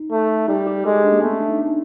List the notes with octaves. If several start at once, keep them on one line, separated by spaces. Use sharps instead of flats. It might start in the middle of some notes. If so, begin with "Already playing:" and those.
Already playing: D#4
A3
G3 D#4
G4
G#3 A4
G4
D4
A#3
A3 B3
C#4
D4
D#4
D4
D#4